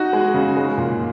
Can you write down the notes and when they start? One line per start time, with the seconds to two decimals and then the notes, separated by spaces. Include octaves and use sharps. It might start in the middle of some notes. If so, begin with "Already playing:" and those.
Already playing: D#4 F#4
0.13 G#3
0.34 C#3
0.56 G#3
0.78 A#2